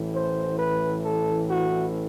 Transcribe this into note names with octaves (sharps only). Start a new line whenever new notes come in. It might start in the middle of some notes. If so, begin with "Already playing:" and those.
Already playing: A1 A2 E3
C5
B4
A4
F#4